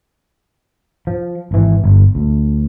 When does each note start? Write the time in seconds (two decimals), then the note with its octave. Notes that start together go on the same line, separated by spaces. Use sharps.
1.07 F3
1.51 G#1 E3
1.84 G1
2.15 D2